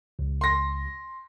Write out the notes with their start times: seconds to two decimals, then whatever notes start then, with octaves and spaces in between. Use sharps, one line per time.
0.19 C#2
0.41 C6 A#6